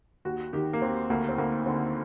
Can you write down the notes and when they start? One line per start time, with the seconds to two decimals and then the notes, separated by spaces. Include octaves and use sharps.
0.25 D#2 F#4
0.53 D#3 G4
0.73 A#3
0.82 D#2 C4
1.10 D2 A#3
1.29 C4
1.38 D2 A#3
1.66 D3 C4